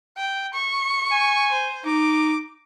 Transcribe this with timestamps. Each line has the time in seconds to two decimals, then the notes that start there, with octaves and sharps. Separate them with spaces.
0.17 G5
0.54 C#6
1.12 G#5
1.52 C5
1.85 D#4 D6